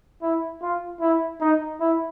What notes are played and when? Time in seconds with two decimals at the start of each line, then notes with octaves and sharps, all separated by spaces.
0.22 E4
0.62 F4
1.01 E4
1.41 D#4
1.81 E4